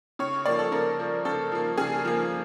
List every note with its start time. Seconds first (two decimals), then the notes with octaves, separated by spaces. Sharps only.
0.19 C#3 C#5
0.46 F3 A#3 D5
0.59 A4
0.72 C#3 A#4
0.99 F3 A#3
1.25 C#3 A4
1.52 F3 A#3
1.78 C#3 G#4
2.05 F3 A#3